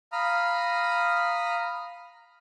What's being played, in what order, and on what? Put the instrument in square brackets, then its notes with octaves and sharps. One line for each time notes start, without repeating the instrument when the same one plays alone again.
[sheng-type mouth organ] F5 A#5 B5 D#6 F6